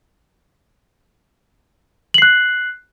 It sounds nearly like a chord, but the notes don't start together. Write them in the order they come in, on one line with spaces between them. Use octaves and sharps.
F#7 C7 F#6